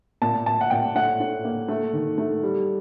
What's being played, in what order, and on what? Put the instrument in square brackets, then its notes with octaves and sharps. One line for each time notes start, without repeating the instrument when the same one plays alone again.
[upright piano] A#2 A5
A#2 A5
F#5
A#2 G5
A2 F#5
A2
A#3
A3
D#3
A3
G3